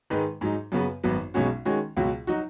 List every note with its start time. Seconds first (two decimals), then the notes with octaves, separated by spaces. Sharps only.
0.10 G#2 D#3 G#3 D#4 B4
0.41 G#2 F#3 D#4
0.72 F#2 C#3 B3 F#4 B4
1.04 G#1 F#2 F#3 B3
1.34 B1 B2 G#3 C#4 F#4
1.65 D#3 G#3 C#4 F#4
1.97 C#2 B2 F#3
2.27 F#3 D#4 F#4